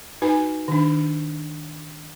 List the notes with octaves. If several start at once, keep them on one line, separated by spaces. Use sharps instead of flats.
D#4 F#4 B4 G#5
D#3 D4